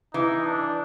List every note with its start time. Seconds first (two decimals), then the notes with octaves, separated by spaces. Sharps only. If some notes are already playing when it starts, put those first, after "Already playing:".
0.14 E3 D#4
0.46 D4